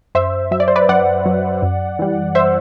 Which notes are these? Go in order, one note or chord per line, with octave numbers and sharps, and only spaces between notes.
F#2 C5 E5
F#3 E5
D5
C5
B4 D5
F#2 D5 F#5
F#3
F#2
E3 G3
C5 E5